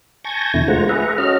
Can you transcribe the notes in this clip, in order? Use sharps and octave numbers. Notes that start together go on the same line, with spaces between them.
G#5 A5 C#6 G6 G#6 A#6
E2 B2 D3 E4 A#6
G#3 A3 F4 C5 F#5 A#5
G#4 B4 E5 F#5 A#5
C#4 F#4 A4 D#5 A#5 F6